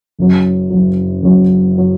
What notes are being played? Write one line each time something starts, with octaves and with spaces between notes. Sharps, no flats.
F#1 F#2 F#3
F#1 F#2 F#3
F#1 F#2 F#3
F#3